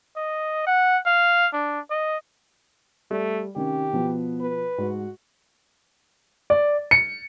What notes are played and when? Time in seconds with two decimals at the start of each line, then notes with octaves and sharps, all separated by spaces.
0.17 D#5
0.67 F#5
1.06 F5
1.53 D4
1.90 D#5
3.11 G3 A3
3.56 C3 D#3 C#4 G4
3.93 B2 F3 B3
4.41 B4
4.78 G#2 F#4
6.50 D5
6.91 C#7